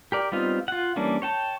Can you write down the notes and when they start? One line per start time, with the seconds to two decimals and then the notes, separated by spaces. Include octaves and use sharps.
0.12 G4 A#4 D5
0.32 G3 B3 C4 D#4 F4
0.68 F4 F#5
0.96 E3 G3 A#3 C#4 D4
1.22 C#5 G5 A5